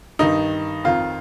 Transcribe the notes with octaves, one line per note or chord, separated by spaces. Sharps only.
G2 D#3 D#4
F2 D#3 F4